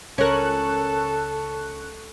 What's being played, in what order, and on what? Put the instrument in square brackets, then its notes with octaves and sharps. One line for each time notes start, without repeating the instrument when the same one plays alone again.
[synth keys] C#2 C#6 F#6 [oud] C#4 A#4 [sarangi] A4